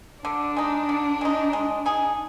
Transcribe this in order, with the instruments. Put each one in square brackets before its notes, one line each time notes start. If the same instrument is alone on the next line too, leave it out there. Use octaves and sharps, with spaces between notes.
[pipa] D3 [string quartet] D4
[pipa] G#3 D#4
D3
G#3 D#4
G#3
D#4 G#4